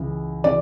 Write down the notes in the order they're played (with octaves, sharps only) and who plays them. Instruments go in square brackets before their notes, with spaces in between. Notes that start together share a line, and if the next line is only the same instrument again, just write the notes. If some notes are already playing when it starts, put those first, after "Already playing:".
Already playing: [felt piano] C#2 C#3 E3
C#3 E3 D5